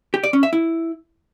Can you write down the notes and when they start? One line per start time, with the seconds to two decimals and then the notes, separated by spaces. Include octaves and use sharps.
0.14 G4
0.23 D5
0.33 C#4
0.43 E5
0.53 E4